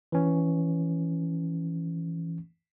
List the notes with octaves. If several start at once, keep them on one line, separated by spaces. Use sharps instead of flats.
E3 C#4